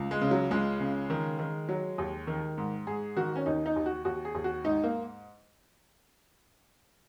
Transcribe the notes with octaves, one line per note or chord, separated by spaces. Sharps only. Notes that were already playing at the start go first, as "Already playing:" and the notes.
Already playing: C#2
G#3
C#3
F#3
C#2 G#3
C#3
D#3
D#3
F#3
D#2
D#3
G#2
G#2 G#4
D#3 F#4
C#4
D#2 D#4
D#4
D#2
F#4
D#2 F#4
G#4
D#2
F#4
G#2 D#4
A#3